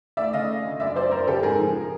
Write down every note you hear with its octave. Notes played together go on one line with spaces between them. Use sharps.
A3 D5 E5
C#3 D#5 F5
A3
D2
F#2 D5 E5
F#2 C5 D5
F#2 A#4 C5
C#3 G4 A4
G#2 G#4 A#4
F3